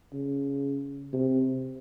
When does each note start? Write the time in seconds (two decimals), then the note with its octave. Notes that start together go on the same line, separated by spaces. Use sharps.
0.13 C#3
1.13 C3